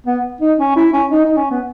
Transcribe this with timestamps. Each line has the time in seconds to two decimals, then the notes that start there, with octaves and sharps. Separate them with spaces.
0.07 B3
0.41 D#4
0.59 C#4
0.76 E4
0.93 C#4
1.11 D#4
1.24 D#4
1.37 C#4
1.51 B3